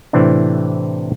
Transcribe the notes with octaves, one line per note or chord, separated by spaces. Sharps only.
A2 C3 E3 C4 D4